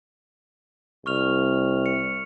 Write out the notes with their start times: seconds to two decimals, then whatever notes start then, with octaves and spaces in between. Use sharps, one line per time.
1.06 C2 C#6 F6 F7
1.86 C#7